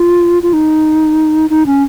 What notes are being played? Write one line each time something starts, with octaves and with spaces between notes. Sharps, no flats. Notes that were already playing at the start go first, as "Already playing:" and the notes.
Already playing: F4
F4
D#4
D#4
C#4